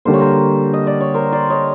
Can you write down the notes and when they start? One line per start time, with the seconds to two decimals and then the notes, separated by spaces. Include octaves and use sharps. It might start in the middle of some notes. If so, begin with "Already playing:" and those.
0.05 D3 G3 A#3 C5
0.13 C#5
0.20 A#4 C5
0.74 D#5
0.87 D5
1.01 C#5
1.14 A#4 C5
1.32 C5 D5
1.50 C#5 D#5